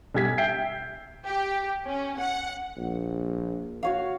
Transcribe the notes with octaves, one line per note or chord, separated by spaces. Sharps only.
B1 G3 G#6 B6
E5 G5 G6 C7 D7
G4
C#4
F#5
A#1
F#4 C#5 F5